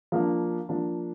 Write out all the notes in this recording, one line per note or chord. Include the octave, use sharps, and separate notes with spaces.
F3 A#3 D4
F3 A#3 D4